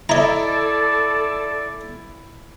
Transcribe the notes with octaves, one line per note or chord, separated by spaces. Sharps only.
E4 A4 D5 D#5 A#5